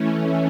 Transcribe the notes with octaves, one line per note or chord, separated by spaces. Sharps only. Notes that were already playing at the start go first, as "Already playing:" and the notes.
Already playing: E3 A3 C#4